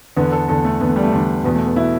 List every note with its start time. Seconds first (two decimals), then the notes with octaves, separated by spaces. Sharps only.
0.16 E2 D3 B3
0.32 A4
0.48 E2 D3 A4
0.65 A3
0.80 E2 D3 B3
0.88 A3
0.96 G3
1.03 A3
1.12 E2 D3 D4
1.44 E2 B2 B3
1.55 A3
1.65 B3
1.76 B2 E4